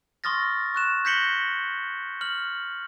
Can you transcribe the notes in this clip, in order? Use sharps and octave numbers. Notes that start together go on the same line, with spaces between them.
C6 C#6 D#6 F6 A6 A#6
C#6 F#6 E7
G6 A#6 B6 C#7 F#7 G7
F6 F#7